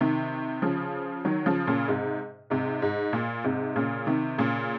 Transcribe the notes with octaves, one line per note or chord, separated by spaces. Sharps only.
C3 D#3
C#3 F3
D#3 F#3
C#3 F3
A#2 C#3
G#2 C3
G#2 C3
G#2
A#2
G#2 C3
A#2 C#3
C3 D#3
A#2 C#3